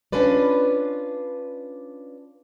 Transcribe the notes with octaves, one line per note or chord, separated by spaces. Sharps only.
C#4 D4 F4 B4 D5